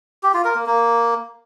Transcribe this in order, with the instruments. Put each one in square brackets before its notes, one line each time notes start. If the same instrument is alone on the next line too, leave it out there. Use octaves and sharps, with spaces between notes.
[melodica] G4
F4
A#4
A#3
A#3